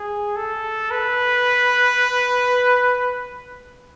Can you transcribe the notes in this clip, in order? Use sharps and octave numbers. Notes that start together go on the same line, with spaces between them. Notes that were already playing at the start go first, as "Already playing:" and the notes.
Already playing: G#4
A4
B4